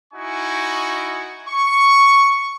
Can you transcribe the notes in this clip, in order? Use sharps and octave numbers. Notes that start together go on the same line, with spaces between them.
D#4 E4 F#4 G#5 C#6
C#6